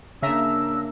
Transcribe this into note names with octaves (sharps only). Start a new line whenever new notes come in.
C#3 A#3 D4 E5 A#5 E6